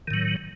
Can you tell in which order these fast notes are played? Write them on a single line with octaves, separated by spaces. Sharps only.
D#3 A2 F#3